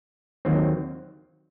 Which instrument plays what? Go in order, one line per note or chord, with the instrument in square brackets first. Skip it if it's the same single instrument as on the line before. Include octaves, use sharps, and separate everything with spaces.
[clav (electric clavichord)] D#2 D#3 F#3 C4